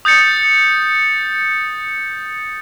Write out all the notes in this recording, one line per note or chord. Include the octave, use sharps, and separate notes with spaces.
D#6 G6 A6 C#7